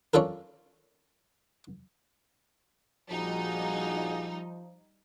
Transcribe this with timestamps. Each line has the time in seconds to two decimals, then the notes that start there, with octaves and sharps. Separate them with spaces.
0.14 C#4 D4 F4 A4 A#4
3.10 A#1 F3 G3 D#4 F#4 G#4